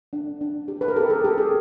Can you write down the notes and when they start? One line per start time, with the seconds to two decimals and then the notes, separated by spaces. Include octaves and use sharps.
0.13 D4
0.41 D4
0.68 G4
0.81 B4
0.88 A#4
0.96 B3 G4 A4
1.10 G#4 A#4
1.24 F#4 G4 A4
1.38 G#4